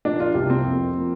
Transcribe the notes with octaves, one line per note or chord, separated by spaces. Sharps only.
A#2 F3 A#3 D4
F4
C2 C3 F3 C4 G4
C4
F2 F3 A#3
F3 A#3